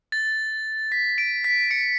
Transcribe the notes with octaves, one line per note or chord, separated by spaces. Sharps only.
A6
B6
D7
B6
C#7